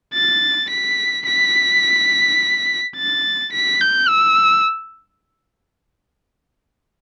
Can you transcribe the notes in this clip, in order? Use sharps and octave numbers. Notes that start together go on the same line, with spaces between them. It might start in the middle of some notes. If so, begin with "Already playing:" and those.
A6
B6
B6
A6
B6
G6
E6